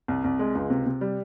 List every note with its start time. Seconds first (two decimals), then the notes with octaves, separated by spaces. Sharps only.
0.08 C2
0.24 C2
0.39 G#3
0.55 C#2
0.70 C3
0.86 C3
1.01 G3